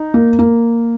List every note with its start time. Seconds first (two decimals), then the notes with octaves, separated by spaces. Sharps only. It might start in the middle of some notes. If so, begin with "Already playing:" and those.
Already playing: D#4
0.14 A#3
0.39 A#3